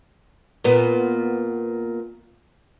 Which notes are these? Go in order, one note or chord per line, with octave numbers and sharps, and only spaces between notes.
A#2 B3